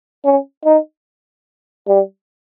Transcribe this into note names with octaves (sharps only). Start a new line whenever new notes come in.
C#4
D#4
G3